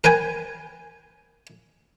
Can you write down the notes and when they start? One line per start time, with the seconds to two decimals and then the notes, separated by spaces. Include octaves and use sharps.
0.04 A#4 B4 G5 G#5